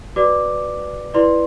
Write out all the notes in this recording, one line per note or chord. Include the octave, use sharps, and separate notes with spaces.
F#4 B4 D5 D6
E4 B4 D5 C6